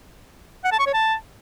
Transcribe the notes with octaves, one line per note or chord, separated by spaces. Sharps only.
F#5
A5
C#6
C#5
A5